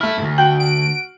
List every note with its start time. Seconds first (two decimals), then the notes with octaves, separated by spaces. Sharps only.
0.01 A3 E4 F6
0.18 D2 G#2
0.38 F#4 G5 F#7
0.60 D7